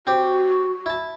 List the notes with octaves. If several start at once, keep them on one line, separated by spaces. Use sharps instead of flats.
C4 F#4 G4
E4 A5